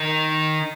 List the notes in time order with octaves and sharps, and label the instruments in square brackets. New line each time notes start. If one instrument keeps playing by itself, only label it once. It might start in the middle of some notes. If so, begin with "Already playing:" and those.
Already playing: [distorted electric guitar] D#3